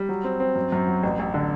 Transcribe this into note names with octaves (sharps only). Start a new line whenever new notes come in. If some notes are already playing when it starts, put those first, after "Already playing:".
Already playing: G3
F#3
C4
C4
F#2
F#2
F#3
A1
A1
D3